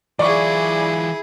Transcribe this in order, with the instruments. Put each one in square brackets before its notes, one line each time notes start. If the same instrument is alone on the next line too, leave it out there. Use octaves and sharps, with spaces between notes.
[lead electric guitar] E3 F4 [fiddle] E4 G#4 [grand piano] D5 C#6